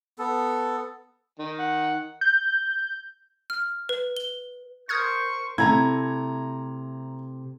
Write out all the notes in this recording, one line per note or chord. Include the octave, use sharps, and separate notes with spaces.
B3 A4
D#3
F#5
G6
F6
B4
G7
A#4 C5 C#6 D#6 F6 G6 G#6
C3 A3 E4 A#5 G#6